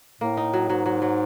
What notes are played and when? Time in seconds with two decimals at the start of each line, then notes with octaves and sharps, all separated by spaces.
0.21 A2 A#3
0.37 D#4
0.53 F#3
0.70 G#2 F#3
0.86 F#3
1.02 F#3